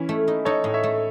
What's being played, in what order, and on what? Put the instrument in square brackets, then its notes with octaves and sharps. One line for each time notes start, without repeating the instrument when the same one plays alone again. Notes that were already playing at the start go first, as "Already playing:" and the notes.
Already playing: [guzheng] E3 [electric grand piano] C#4 E4
[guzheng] A3
D#4
[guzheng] D#4 [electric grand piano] A4 C#5
[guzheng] A2 [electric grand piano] D#5
[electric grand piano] C#5 E5
[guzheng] A3